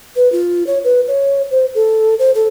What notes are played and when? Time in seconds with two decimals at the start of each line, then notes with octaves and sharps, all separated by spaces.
0.16 B4
0.32 F4
0.67 C#5
0.84 B4
1.08 C#5
1.51 C5
1.75 A4
2.19 C5
2.35 A4